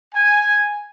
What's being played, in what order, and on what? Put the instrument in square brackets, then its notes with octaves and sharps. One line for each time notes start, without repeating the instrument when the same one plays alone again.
[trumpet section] G#5